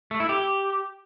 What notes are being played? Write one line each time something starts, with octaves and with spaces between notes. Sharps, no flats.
A3
E4
G4